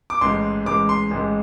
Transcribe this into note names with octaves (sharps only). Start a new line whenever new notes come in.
D6
A1 G#2 G#3 C6
A1 G#2 G#3 D6
C6
A1 G#2 G#3